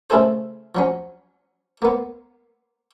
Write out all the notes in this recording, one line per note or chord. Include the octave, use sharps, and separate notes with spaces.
C#3 A3 E4 G#4 A4 C5
F3 F#3 C#4
A#3 B3